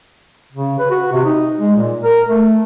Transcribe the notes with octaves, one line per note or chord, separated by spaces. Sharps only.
C#3
B4
F#4
C3
D#4
G#3
A#2
A#4
A3